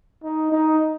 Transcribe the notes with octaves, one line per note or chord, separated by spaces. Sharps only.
D#4
D#4